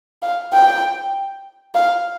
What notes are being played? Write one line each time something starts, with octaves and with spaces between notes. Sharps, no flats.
F5
G5
F5